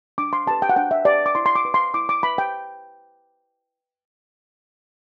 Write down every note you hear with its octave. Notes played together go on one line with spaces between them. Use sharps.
D4 D6
C6
G4 B4 A5
G5
F#5
D4 G5
E5
G4 B4 D5
D6
E4 C6
C6
D6
B4
C6
E4 D6
D6
B4 B5
G5